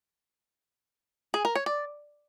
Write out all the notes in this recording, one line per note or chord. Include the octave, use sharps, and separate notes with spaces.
G#4
A#4
C#5
D5